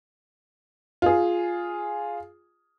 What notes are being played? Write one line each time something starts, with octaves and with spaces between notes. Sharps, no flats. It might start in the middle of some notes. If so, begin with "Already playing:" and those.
F4 G#4